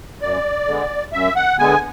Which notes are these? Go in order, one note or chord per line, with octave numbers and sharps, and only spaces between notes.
F#2 D5
D3 G#3 B3
F#2 E5
F#5
D3 G#3 B3 G#5